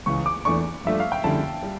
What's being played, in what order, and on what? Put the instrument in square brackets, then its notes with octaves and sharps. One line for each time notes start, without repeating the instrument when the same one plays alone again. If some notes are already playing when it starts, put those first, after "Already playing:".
[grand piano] C#2 C#3 E3 [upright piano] C#6
[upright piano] D6
[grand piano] E2 E3 A3 D4 [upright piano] C#6
[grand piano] G2 F3 A3 D4 [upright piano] E5
[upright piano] F5
G5
[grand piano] F2 D3 G3 C#4 E4 [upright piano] A5
[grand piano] G3